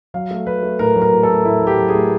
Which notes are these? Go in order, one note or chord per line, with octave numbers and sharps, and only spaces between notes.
F#3 F5
A3
F#3 B4
A3
A2 A#4
F#3
A#4
A2
A4
A3
A2 E4
F#3
G4
F#3
G#4
A2